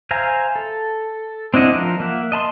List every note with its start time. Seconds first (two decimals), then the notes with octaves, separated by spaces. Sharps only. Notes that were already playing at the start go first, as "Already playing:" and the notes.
0.11 C5 E5 F5 G#5 A#5
0.56 A4
1.54 C4 D4 E4 D#5 F#5
1.74 F3 A#4
2.00 A#3 E5 F#5
2.32 D#5 A5 B5 C6